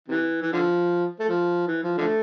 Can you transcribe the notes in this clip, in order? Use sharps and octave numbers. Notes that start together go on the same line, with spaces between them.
C3 E3
E3
D3 F3
A3
F3
E3
F3
D3 F3 A3